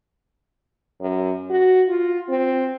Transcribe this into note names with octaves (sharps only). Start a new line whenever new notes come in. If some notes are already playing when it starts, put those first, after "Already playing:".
F#2
F#4
F4
C4